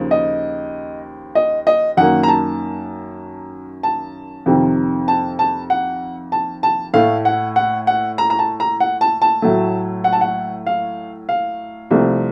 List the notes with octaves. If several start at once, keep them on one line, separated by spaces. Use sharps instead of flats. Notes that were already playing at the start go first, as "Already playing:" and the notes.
Already playing: D#2 C#3 F3 A#3
D#5
D#5
D#5
F#2 D#3 A#3 F#5
A#5
A5
A5
F2 C3 D#3
A5
A5
F#5
A5
A5
A2 A3 F5
F#5
F#5
F#5
A#5
A#5
A5
A#5
F#5
A5
A5
A2 F#3 A3
F#5
A5
F#5
F5
F5
C2 C3 F3 A3